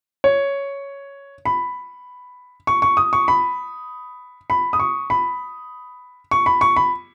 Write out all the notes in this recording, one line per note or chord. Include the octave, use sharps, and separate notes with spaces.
C#5
B5
C#6
C#6
D#6
C#6
B5
B5
D#6
C#6
B5
C#6
B5
C#6
B5